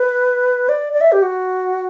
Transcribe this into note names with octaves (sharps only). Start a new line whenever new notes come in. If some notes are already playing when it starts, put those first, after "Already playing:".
Already playing: B4
D5
D5
E5
G4
F#4